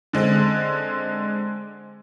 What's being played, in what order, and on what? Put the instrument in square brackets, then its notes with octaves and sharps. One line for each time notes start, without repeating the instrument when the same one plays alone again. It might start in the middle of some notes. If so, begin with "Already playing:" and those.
[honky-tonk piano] D3 G#3 C4